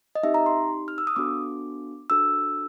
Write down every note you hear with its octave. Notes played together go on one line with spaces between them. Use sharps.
D#5
C4 D#4 G4 E5
A#5
C6
F6
E6
D#6
B3 D4 F#4 A4 D6
D4 F#4 A4 E6